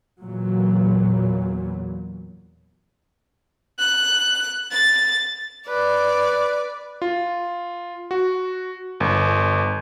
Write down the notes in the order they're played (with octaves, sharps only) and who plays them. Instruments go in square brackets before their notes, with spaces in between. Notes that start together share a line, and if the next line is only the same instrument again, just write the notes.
[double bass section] E2 A#2 F#3
[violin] F#6
A6
[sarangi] B4 [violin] D5
[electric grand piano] F4
F#4
G1